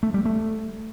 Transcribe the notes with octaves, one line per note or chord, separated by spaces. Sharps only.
A3
G3
A3